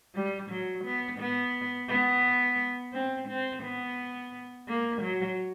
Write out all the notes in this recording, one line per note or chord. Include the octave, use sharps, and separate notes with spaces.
G3
F#3
B3
B3
B3
C4
C4
B3
A#3
F#3